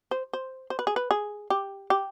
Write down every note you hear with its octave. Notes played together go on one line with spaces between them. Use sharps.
C5
C5
C5
B4
G#4
B4
G#4
G4
G4